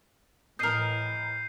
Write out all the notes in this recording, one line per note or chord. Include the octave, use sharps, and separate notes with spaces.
A2 E3 A#4 D#5 G6 C7 D#7